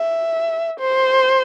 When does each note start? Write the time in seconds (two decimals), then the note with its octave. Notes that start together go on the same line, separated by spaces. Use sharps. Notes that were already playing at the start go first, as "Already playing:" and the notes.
Already playing: E5
0.79 C5